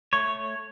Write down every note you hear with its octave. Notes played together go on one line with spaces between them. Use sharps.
A3 C#5